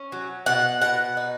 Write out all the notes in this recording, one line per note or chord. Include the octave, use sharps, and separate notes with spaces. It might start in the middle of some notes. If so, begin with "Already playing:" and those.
Already playing: C#4
F#3
B2 F#5
B2 F#5
D#4